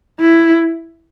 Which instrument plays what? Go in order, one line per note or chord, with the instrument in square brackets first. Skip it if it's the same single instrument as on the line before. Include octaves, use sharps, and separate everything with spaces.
[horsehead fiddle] E4